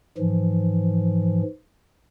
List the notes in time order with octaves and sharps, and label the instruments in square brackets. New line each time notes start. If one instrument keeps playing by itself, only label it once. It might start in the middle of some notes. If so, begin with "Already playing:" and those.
[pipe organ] G#2 E3 F3